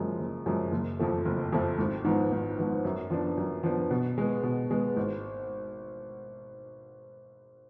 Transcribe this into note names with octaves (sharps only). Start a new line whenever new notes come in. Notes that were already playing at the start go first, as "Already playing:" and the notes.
Already playing: F#1 F#2 F3 G#3
F#1
F#2 F3 G#3
F#1
F2 F3 A3
F#1
F2 F3 A3
G#1
G#2 F3 B3
G#1
G#2 F3 B3
F#2
F3 B3 D4
F#2
F3 B3 D4
B2
G#3 B3
B2
G#3 B3
G#1